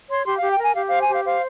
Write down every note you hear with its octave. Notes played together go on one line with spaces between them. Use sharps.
C#5 C6
G4 C6
G4 F5
G5
A#4 G#5
G4 F5
C5 F5
G#5
G4 F5
C5 F5